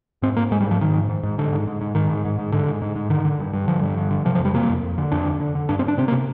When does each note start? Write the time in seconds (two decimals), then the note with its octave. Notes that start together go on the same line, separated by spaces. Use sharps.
0.22 G#2 C4
0.37 G#2 A#3
0.51 G#2 G#3
0.61 G3
0.66 G#2 F3
0.81 G#2 D#3
0.95 G#2
1.09 G#2
1.23 G#2
1.38 G#2 D3
1.52 G#2
1.67 G#2
1.81 G#2
1.95 G#2 D#3
2.09 G#2
2.25 G#2
2.39 G#2
2.52 G#2 D3
2.67 G#2
2.82 G#2
2.96 G#2
3.10 D3 D#3
3.25 D3
3.39 G2
3.54 G2
3.68 D3 F3
3.83 G2
3.97 D3
4.11 D3
4.25 C3 F3
4.35 F3
4.40 F2
4.45 G3
4.54 C3 A#3
4.69 F2
4.83 F2
4.98 D3
5.12 F2 D4
5.26 D3
5.40 D3
5.55 D3
5.69 G2 D4
5.79 C4
5.84 G2
5.88 D4
5.98 C3 C4
6.08 A#3
6.12 C3